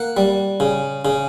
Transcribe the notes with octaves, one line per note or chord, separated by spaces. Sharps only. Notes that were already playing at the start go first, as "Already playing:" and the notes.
Already playing: A#3 F#5
G3
C#3
C#3